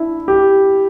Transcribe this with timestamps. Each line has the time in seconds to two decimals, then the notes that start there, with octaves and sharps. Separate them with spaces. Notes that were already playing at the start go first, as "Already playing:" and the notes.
Already playing: D4 E4
0.28 G4